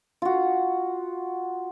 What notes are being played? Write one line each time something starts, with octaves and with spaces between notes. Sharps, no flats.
F4 F#4